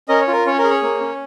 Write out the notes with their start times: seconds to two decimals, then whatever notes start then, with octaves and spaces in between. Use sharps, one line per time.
0.09 C#4 A#4 D#5
0.21 C#5
0.27 F4
0.33 A#4
0.46 C#4 C#5
0.59 A#4
0.64 G#4
0.70 C#5
0.83 A#3
1.00 C#4